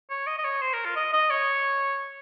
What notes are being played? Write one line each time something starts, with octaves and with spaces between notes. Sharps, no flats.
C#5
D#5
D#5
C#5
C5
A#4
F4
D#5
D#5
C#5